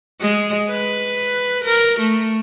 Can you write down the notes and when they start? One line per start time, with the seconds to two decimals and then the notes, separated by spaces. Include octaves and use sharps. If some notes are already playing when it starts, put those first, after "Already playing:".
0.21 G#3
0.70 B4
1.65 A#4
2.01 A3